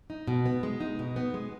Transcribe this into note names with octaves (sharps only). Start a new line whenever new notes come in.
D#4
B2
B3
G#3
D#4
B2
B3
G#3